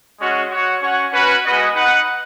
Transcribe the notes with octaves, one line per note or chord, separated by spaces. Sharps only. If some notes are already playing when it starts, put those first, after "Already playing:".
G#3 C#4 F#4
F#4 C#5 F#5
C#4 F#4 C#5 F#5
C#4 F#4 B4
G#3 B3 F#4 B4 D#5
D#4 B4 F#5